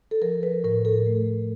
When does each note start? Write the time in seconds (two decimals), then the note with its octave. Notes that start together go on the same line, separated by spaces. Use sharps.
0.11 A4
0.22 F3 A#4
0.43 B4
0.64 A2 A#4
0.85 A4
1.07 A3